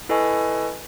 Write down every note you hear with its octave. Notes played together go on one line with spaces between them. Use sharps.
E4 A4 B4 D#5 G#5 C#6